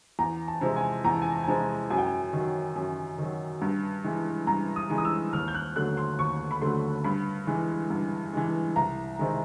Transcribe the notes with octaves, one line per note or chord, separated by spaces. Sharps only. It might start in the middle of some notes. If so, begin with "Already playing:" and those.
E2 A#5
A5
C3 F3 G#3
G#5
E2 A#5
A5
G#5
A5
G#5
C3 F3 G#3 A5
F#2 G#5
G5
G#5
D#3 F#3
F#2
D#3 F#3
G2
E3 G#3
G2 A#5
D#6
E3 G#3
D#6
E6
D#2 F6
G6
F#6
D3 F#3 A3 F#6
C6
D#2 C#6
B5
D3 F#3 A3 C6
G2 B5
E3 G#3
G2
E3 G#3
C2 A#5
C3 D#3 G#3